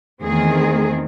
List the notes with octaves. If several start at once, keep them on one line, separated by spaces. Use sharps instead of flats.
E2 D#3 A3 C4 G#4